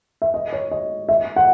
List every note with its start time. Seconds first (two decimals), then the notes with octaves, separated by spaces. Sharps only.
0.22 E5
0.34 D#5
0.53 C#5
0.71 D#5
1.09 E5
1.36 F#5